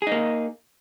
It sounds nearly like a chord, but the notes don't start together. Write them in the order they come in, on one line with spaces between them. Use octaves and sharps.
G#4 D#4 A#3